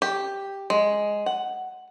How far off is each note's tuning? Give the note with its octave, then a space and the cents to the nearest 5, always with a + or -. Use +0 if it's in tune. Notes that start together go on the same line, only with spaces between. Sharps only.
G4 +5
G#3 +0
F#5 +5